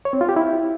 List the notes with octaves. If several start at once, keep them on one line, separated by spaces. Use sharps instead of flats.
C#5
C4
F4
G4
E4